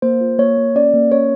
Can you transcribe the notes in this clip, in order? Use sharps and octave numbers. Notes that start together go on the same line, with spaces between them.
A#3 C5
F4
A#3 C#5
A#3
C#4 D5
A#3
C#4 C#5